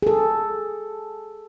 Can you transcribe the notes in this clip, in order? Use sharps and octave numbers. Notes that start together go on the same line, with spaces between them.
G#4 A4